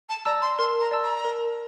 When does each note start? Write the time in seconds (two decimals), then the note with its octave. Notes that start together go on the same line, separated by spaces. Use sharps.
0.09 A5
0.25 D5 A5 A#5 E6
0.42 C6
0.58 A#4 C6
0.80 A#5
0.91 D5 A5 E6
1.03 A#5
1.24 A#4